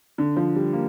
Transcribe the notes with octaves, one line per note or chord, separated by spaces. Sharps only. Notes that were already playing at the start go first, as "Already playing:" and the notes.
D3
F3
G3
A#3